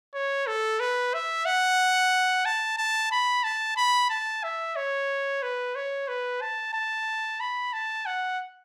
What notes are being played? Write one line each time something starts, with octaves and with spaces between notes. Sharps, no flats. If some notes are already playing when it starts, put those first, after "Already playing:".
C#5
A4
B4
E5
F#5
A5
A5
B5
A5
B5
A5
E5
C#5
B4
C#5
B4
A5
A5
B5
A5
F#5